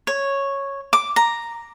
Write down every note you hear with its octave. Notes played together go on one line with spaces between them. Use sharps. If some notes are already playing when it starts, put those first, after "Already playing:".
C#5
D6
A#5